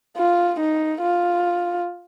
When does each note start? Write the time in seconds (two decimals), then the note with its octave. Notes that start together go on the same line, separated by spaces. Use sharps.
0.17 F4
0.60 D#4
1.02 F4